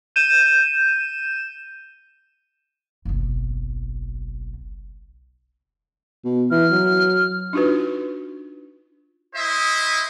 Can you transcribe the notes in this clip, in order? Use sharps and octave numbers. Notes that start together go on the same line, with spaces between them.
G6 D#7 E7
F#1 B1
B2
E3 F6
F#3
D4 D#4 F4 F#4 B4
E4 C5 D#5 E5